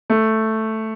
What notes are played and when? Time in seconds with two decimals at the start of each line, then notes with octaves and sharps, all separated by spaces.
0.10 A3